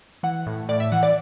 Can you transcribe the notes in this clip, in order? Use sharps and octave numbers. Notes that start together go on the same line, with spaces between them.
E3 F#5
A2
A2 D5
E5
E3 F#5
D5